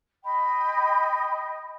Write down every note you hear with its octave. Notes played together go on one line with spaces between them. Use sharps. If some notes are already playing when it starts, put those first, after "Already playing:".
D#5 G5 B5